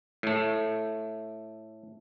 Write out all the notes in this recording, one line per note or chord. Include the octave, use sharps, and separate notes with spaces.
A2 A3